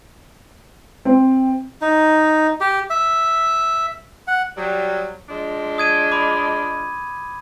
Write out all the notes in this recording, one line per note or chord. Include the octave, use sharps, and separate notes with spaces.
C4
D#4
G4
E5
F#5
F#3 G3
F3 G#3 D4
D#6 G#6 D#7
B5 D6